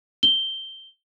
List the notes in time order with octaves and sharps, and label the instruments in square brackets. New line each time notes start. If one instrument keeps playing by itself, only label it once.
[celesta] G7